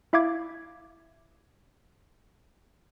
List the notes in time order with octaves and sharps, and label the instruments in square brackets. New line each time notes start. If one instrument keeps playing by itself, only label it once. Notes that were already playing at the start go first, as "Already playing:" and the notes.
[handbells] E4 E5 F5 D6 G#6